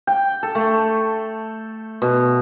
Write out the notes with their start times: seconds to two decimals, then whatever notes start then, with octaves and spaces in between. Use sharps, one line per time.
0.07 G5
0.43 A4
0.55 A3
2.02 B2